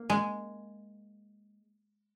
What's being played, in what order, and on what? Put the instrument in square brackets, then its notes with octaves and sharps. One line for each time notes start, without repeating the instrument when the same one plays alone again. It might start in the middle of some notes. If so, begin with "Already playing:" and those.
Already playing: [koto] A#3
G#3